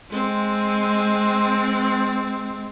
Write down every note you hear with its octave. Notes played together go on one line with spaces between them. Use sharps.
G#3 C4